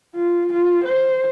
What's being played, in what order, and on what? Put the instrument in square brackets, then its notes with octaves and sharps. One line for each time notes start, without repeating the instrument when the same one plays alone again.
[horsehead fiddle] F4
F4
C5